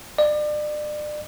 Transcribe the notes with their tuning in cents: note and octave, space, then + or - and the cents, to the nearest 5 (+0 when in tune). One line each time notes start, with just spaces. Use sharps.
D5 +35